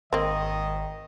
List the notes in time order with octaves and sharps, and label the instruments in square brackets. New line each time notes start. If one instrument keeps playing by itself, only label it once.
[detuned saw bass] G#1 [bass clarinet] D#3 [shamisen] A#3 C4 [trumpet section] D#5